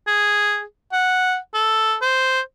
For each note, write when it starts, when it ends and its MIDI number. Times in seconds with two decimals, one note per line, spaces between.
0.07 0.63 68
0.93 1.37 78
1.54 1.95 69
2.02 2.41 72